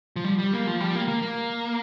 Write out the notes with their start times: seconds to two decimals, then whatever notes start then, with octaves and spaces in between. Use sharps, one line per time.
0.16 F3
0.24 G3
0.39 G3
0.53 A#3
0.67 F3
0.80 G3
0.95 A#3
1.08 A#3
1.22 A#3